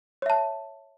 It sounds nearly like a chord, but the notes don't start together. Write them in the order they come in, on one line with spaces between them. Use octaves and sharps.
C#5 E5 A5